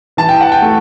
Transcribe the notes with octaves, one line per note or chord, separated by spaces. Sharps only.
E3 A5
G5
F#5
G5
A3